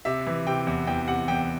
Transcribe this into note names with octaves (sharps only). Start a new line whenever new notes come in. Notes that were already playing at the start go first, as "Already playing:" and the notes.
C3 E5
E3
C3 G5
E2
E2 G5
C3 F#5
E2 G5